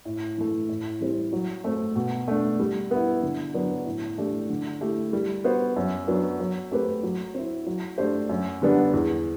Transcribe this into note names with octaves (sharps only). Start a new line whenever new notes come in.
A2
E3 A3
A2
E3 G3 C4
F#3
A3 C4
B2
A3 D4
G3
B3 E4
D3
F#3 B3 D4
A2
E3 A3 D4 G4
D3
A3 E4 G4
G3
B3 F#4 C5
F#2
F#3 B3 D4
F#3
A3 C4 G4 B4
F#3
C4 E4
F#3
A3 D4 G4 C5
F#2
D3 G3 B3 D4
E2